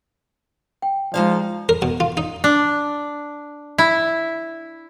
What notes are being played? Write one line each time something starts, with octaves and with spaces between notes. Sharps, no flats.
G5
F3 G#3 D#4 D5 F5
A#4
B2
F4
D#4
D4
E4